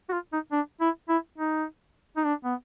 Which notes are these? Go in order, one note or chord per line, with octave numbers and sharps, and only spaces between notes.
F#4
F4
D#4
D4
E4
E4
D#4
D#4
D4
B3